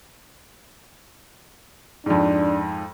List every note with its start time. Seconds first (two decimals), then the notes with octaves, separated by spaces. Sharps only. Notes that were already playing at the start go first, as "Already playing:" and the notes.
2.06 F2 G#2 D4